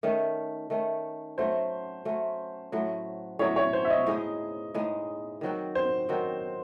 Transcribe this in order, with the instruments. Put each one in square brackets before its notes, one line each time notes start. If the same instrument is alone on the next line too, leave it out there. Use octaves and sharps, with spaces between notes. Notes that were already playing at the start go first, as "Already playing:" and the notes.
[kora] D#3 A3 C#4
D#3 A3 C#4
[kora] F#3 A3 C#4 [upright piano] C5
[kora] F#3 A3 C#4
A2 F#3 A3
[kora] A2 F#3 A3 [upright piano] C#5
[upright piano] C#5
C5
E5
D#5
[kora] A2 G#3 D#4 G#4
A2 G#3 D#4 G#4
D#3 F#3 C4 F#4
[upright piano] C5
[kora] D#3 F#3 C4 F#4